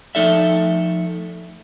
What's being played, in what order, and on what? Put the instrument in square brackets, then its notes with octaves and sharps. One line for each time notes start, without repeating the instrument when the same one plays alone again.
[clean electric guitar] F3 A3 D#4 A4 D5 E5